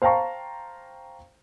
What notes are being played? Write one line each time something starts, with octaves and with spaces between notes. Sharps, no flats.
C5 F5 G5 A5 A#5 C#6